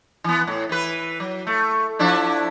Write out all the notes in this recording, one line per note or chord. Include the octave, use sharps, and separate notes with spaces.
E3 B3
A2
E3 B4
F#3
A3
F3 D4 E4